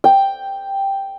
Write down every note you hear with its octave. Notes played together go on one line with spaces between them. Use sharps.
G5